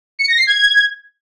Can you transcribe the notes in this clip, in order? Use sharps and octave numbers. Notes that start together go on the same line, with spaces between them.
C#7
A#6
C7
G#6